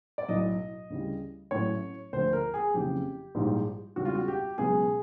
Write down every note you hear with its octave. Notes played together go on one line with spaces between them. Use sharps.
D5
B1 A2 F#3 A3 D#5
D2 C#3 E3 G3
A1 A2 F#3 A3 C#5
D2 D3 F3 A3 C5
A#4
G#4
F#1 F2 C#3 E3 G4
A#1 G#2 E3 G3
E1 E2 C#3 E3 G3 F#4
F4
F#4
G4
C#2 B2 F#3 G#4